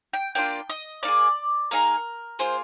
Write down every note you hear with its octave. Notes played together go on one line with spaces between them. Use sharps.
G5
A#3 D4 F4 G5
D#5
A#3 D#4 D5
G#4
A#3 D#4 G#4 A#4
A#3 F4 G#4 C5